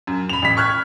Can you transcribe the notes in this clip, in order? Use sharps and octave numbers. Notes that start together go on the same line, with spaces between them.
F#2
B5 F7
A1 B6
C#6 F6 F#6 G#6